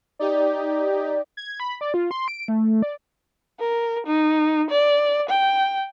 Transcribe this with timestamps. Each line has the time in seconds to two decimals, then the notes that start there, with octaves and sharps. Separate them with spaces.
0.19 D#4 G4 D5
1.37 G#6
1.60 B5
1.81 D5
1.94 F4
2.11 C6
2.28 D7
2.48 A3
2.83 D5
3.60 A#4
4.07 D#4
4.70 D5
5.29 G5